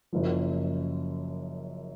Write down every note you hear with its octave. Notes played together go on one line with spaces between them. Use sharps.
F#1 F#2 F3